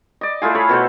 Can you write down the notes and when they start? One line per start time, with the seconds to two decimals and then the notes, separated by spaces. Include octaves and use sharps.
0.21 D5 D#5
0.42 A3 E4 F4 G#4
0.55 A4 C#5 B5
0.69 B2 F#4 A4 C5